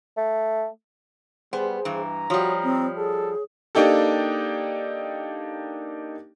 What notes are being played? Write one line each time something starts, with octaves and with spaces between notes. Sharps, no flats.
A3
G3 B3 G#4 C5
G2 E3 A#5
F3 G3 F#4 C#5 D#6
C4
G#4 A4
A#3 D4 D#4 G4 A4